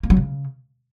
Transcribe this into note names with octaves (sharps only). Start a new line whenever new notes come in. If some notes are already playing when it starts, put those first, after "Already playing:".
A#3
F#3
C#3